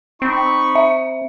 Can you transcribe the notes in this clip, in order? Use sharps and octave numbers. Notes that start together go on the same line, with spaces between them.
C4 D#4 B5 C#6
E5